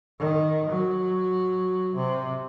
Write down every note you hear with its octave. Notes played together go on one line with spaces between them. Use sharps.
D#3
F#3
C3